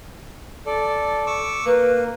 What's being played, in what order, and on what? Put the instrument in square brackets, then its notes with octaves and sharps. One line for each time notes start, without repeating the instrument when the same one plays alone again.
[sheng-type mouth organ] A4 D5
C#6 D6 E6
[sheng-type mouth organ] A#3 [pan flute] B4